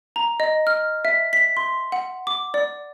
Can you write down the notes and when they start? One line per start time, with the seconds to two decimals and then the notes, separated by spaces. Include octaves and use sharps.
0.16 A#5
0.40 D#5
0.67 F6
1.05 E5
1.33 B6
1.57 C6
1.92 F#5
2.27 D6
2.54 D5